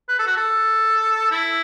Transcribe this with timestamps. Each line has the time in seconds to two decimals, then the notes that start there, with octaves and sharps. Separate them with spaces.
0.09 B4
0.19 A4
0.27 F#4
0.37 A4
1.31 E4